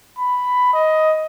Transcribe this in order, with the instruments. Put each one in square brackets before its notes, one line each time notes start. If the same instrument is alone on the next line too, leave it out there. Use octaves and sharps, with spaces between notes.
[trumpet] B5
D#5